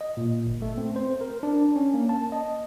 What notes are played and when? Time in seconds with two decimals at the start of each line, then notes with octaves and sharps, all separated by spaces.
0.01 D#5
0.17 A#2
0.47 G1
0.62 A3
0.78 C4
0.96 C5
1.21 A#4
1.43 D4
1.76 C#4
1.94 A#3
2.09 A5
2.32 D#5